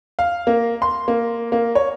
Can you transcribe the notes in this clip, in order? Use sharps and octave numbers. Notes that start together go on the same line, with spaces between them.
F5
A#3
C6
A#3
A#3
C#5